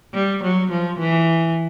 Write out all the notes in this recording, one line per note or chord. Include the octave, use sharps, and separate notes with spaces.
G3
F#3
F3
E3